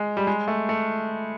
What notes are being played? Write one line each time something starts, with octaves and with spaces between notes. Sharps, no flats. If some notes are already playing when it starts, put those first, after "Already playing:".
Already playing: G#3
G3
G#3
A3
A3